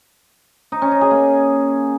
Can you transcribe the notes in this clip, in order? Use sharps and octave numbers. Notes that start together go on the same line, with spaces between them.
D#4
C#4
D#4
G#4
A#3